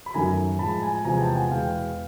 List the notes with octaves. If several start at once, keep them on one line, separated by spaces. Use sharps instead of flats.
B5
F#2 D#3 F#3 A3 G#5 A#5
A2 F3 G#3 A5 B5
G#5 A#5
E2 C3 F3 G#3 G#5 A#5
G5 A5
F#5 G#5
E2 B2 G#3 F5 G5